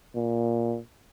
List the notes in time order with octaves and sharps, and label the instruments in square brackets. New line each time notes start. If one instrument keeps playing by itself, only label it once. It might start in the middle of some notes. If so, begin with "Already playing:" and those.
[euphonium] A#2